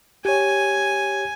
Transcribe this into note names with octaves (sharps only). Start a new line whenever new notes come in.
G4 C#5 G#5